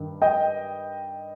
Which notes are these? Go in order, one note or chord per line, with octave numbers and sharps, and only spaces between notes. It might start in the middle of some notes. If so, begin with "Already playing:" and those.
Already playing: G2 D#3
D#5 G5